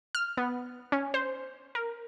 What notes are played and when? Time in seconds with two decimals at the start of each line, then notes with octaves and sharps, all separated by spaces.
0.15 F6
0.37 B3
0.92 C#4
1.14 C5
1.75 A#4